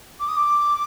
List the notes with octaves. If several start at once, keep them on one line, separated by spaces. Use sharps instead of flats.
D6
D#6
D6